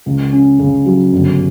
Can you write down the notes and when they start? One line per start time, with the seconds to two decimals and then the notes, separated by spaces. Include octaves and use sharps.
0.06 C#2
0.33 C#4
0.59 C#3
0.86 F#3
1.12 G1